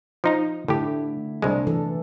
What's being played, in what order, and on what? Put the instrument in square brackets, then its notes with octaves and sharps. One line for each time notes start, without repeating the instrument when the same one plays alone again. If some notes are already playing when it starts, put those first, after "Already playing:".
[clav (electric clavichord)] F3 D#4 A#5
[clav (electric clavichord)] A2 G4 [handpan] D3 A3 E4
[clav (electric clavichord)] C2 G#3 [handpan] D4
[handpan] E3 A4